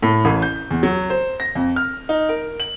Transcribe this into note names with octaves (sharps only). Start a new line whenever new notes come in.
A2
A1
G6
E2
F#3
C5
A#6
F2
F6
D#4
A#4
F#7